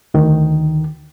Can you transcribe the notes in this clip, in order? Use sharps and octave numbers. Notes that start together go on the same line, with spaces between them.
D2 D#3